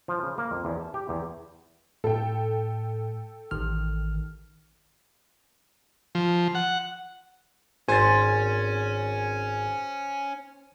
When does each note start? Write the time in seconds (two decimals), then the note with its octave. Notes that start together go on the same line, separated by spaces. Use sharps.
0.08 F3
0.23 C#3
0.38 A#3
0.51 F2
0.65 E2
0.81 A5
0.94 G4
1.09 E2
2.04 A2 A4 G5
3.51 A1 D#3 F6
6.15 F3
6.55 F#5
7.89 G#1 C#4 C5 G#5 A6